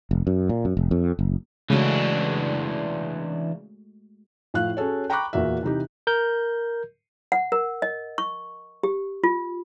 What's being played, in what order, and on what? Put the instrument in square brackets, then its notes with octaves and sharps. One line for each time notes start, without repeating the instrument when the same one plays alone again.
[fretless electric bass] F1
F#2
A#2
F#2
F1
F2
F#1
[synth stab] C#3 [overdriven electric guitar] E3 D4 [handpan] G#3 A3 F#4
[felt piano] A2 F3 F5 F#6
C#4 F#4 G#4 A4 C#5
G5 A#5 B5 C#6 D6 F#6
E2 A#2 A#3 F#4 E5
C3 E3 D#4 G4
[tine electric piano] A#4 G6
[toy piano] F#5
A#4
D#5
C#6
G4
F4